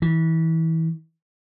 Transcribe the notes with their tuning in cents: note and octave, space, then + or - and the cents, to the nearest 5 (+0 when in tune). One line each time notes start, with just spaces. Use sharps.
E3 -25